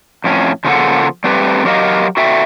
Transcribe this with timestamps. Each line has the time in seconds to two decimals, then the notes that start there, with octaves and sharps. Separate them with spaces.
0.24 F2 A2 C#4
0.65 C#3 F3 A#3 G#4 A4 F#5
1.24 G3 A3 C4 G4 B4
1.65 F#3 G4 A#4 D#5 F5
2.17 F#4 A4 E5 G5